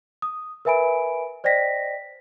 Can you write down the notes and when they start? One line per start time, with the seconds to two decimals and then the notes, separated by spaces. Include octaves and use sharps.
0.22 D#6
0.65 A#4 B4 E5 G#5 B5 D7
1.44 C5 D5 D#5 G5 A#6 B6